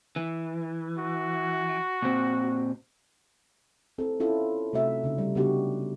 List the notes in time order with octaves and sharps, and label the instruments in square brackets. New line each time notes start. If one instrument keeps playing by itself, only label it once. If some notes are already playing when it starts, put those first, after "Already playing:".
[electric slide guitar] E3
[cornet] F#4
[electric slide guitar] A#2 C4
[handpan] C4 E4 A4
C#4 E4 F4 A4
C3 A3 F#4 E5
C#3 D#4
G3
C#3 B3 D4 D#4 F#4 G4